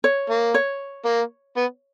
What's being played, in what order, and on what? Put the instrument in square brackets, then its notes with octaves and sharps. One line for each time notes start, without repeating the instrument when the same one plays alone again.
[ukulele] C#5
[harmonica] A#3
[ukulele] C#5
[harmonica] A#3
B3